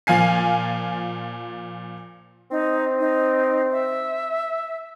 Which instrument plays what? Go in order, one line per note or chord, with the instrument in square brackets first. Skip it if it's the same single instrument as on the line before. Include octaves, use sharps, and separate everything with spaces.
[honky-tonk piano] A#2 F3 F5 G#5 C7
[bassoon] C4 [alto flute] D#4
[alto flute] D#4
E5